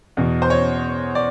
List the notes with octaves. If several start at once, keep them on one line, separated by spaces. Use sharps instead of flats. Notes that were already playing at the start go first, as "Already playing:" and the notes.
E2 B2
C5
C#5
D5